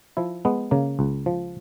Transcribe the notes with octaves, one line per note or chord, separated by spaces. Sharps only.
F3 E4
G#3 B3
C#3 A#3
C#2
F3